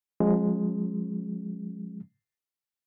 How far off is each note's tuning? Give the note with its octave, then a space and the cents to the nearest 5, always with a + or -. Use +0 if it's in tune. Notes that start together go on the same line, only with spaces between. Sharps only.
F3 +35 G#3 +0 C#4 -40